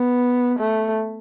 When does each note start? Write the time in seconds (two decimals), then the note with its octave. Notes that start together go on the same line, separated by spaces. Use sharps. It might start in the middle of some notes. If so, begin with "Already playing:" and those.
Already playing: B3
0.59 A3